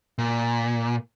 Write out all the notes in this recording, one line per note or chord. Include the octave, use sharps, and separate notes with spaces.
A#2